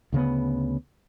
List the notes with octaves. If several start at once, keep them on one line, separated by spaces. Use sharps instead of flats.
D2 C#3 G3 B3